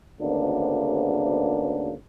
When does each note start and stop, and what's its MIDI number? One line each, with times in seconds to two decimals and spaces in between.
0.20 1.92 32
0.20 1.92 38
0.20 1.92 49
0.20 1.92 58
0.20 1.92 59
0.20 1.92 62